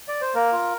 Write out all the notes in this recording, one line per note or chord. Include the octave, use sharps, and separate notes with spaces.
D5
C5
A#3 A#4
F4